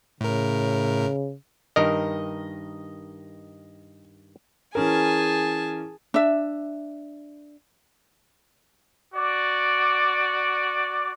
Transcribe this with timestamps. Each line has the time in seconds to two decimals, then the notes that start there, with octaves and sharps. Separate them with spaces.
0.21 A2 C#3 A#4
1.76 G2 D#3 A#4 D#5
4.75 E3 C#4 G#4 A#4 G#5 A5
6.14 D4 E5
9.15 F#4 D5